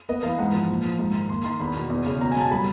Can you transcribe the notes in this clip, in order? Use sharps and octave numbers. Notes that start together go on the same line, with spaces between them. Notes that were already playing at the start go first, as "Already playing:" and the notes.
B3 D#5
E3 F5
G#2 F#5
F3
A#2
F3
G#2
D#3
A#3 C6
D#3 C6
E2 B5
B2
E2
C#3
B2 A#5
G#5
F#3 A5
G3 B5